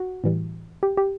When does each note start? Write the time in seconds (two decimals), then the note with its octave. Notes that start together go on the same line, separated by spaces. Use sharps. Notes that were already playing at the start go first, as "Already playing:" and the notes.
Already playing: F#4
0.24 A2 E3 G3
0.83 G4
0.97 G4